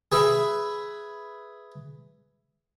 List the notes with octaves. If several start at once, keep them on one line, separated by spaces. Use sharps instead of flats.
G#4 B4 E5